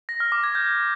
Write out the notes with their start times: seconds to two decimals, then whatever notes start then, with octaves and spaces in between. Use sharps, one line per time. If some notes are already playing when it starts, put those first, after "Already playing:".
0.09 A#6
0.20 F6
0.32 D6
0.44 G#6
0.55 G6